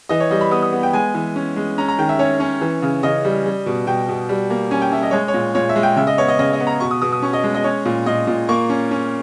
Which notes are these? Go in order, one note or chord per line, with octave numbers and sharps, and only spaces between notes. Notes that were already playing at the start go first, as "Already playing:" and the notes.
E3 D#5
C#5
G3 D#5
B5
B3 D#6
D#6
B3
G5
G#3 G#5
E3
C#4
G#3
C#4 A#5
A#5
D#3 G5
E5
C#4 C#5
C#4
E3
C#3
C#3 D#5
G3
G3
B2
B2 G5
B2
G3
A#3
C#4 G#5
G5
C#4 E5
D#5
G#3 C#5
C#5
A#2
A#2 C#5
E5
G#3
G5
C#3 E5
D#5
B3 C#5
D#5
C#3 D#5
D#5
B3
A#5
B2 C#6
D#6
B2 D#6
D#6
C#4 C#6
D#5
G#3
D#5
C#4 C#5
A#2
A#2 D#5
A#2
A#3 C#6
C#4
C#4